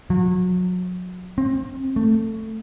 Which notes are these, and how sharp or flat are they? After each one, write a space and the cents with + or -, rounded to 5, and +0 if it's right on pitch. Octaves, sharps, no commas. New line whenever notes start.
F#3 -30
C4 +30
A3 +15